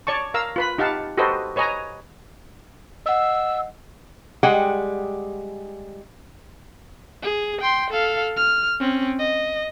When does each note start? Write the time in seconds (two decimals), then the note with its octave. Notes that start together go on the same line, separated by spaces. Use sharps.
0.07 C#5 D5 A5 C#6
0.34 A#4 F5 A#5 E6
0.56 F4 B4 B5
0.78 D#4 G4 F5 F#5 A5
1.17 F#4 G4 A4 B4 C5 D#5
1.56 B4 C#5 D#5 G#5 A#5
3.06 D#5 F#5 E6
4.43 G3 G#3 G#4 F#5 G5
7.23 G#4
7.61 G5 C6
7.91 A4 F5
8.37 F6
8.81 C4 C#4
9.19 D#5